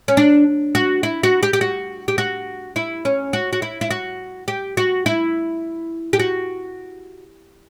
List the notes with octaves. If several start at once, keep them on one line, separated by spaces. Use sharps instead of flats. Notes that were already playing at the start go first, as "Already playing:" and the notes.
C#4
D4
F#4
E4
F#4
G4
G4
F#4
G4
F#4
E4
C#4
F#4
F#4
E4
E4
F#4
G4
F#4
E4
G4
F#4